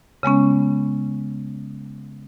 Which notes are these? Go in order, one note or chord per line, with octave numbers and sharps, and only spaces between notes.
C#3 G#3 B3 C#4